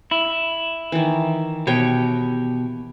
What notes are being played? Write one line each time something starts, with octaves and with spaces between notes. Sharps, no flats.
E4
D#3 E3
B2 G4 C#5 G5